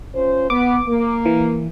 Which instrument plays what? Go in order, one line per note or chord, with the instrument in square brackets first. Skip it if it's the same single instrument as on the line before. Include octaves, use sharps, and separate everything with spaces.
[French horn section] C#4 F4 C5
[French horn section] B3 [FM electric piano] D6
[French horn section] A#3
[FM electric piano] E3